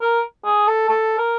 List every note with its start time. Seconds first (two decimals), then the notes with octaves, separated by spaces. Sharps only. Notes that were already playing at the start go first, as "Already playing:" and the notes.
0.01 A#4
0.45 G#4
0.67 A4
0.89 A4
1.18 A#4